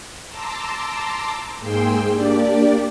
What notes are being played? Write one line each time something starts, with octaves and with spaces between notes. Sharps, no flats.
A5 A#5 C6 D6 E6
G#2 A#3 G#4 G5 C6 E6
A#3 D4 G4 D5